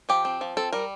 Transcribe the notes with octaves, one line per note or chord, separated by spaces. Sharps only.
F3 G4
C4
F3
C4 A4
G3 A#4